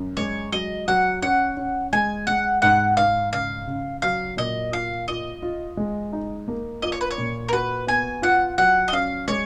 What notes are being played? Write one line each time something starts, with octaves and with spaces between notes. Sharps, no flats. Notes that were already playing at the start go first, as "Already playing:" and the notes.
Already playing: F#2
G#3 C#5
F#3 D#5
F#3 F#5
C#4 F#5
C#4
G#3 G#5
G#3 F#5
G#2 F#5
G#2 F5
C#3 F5
C#3
F#3 F5
A#2 D#5
F4 F5
F4 D#5
F4
G#3
D#4
A#3
F4 D#5
C#5
B4
C#5
A#2
A#4
F#4 B4
B3 G#5
F4 F#5
F#3 F#5
D#5
C#4 F5
G#3 C#5